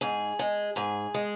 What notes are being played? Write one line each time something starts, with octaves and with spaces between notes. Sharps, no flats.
G#2 G#4
G#3
G#2 G#4
G#3